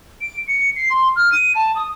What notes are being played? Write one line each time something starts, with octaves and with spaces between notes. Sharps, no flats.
D7
C#7
C7
C6
F6
D#7
A5
D#6